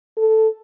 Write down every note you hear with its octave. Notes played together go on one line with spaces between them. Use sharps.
A4